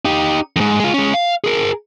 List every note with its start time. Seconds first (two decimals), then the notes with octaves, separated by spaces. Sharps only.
0.05 D#4 G4
0.56 F2 G#2
0.80 G#3 F4
0.94 G#3 C#4
1.14 F5
1.44 G#4 A#4